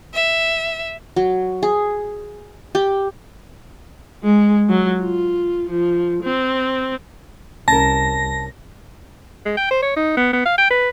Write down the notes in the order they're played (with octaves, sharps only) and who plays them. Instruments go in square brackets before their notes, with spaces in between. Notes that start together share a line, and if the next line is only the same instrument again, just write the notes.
[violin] E5
[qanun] F#3
G#4
G4
[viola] G#3
F#3
F4
F3
C4
[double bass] C2 [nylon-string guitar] C#4 A#4 [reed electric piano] A5 [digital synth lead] A#6
[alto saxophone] G#3
G5
C5
C#5
D#4
B3
B3
F5
G5
B4